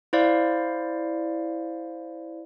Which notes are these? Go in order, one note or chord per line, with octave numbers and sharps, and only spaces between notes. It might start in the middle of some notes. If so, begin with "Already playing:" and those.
E4 C5 D5 F5